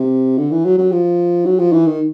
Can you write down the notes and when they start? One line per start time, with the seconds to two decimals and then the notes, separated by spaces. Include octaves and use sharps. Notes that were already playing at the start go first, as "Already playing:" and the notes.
Already playing: C3
0.38 D3
0.51 E3
0.65 F#3
0.78 F#3
0.92 F3
1.46 F#3
1.59 F3
1.73 E3
1.86 D#3